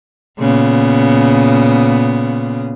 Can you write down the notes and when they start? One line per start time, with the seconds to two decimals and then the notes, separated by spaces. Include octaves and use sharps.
0.38 A#2 C#3 B3